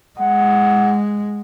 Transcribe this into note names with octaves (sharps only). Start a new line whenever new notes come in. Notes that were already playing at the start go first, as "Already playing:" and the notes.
G#3 F#5